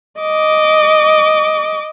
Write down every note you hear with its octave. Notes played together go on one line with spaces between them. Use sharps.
D#5 D6